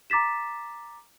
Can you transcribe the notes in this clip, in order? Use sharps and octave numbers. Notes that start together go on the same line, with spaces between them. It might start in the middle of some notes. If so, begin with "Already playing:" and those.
A#5 D6 A6 B6 E7